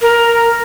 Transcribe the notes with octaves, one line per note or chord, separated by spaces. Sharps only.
A#4